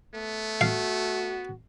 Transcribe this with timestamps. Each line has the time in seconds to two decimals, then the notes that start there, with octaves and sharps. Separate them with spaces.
0.14 A3 B3
0.61 F#4 F5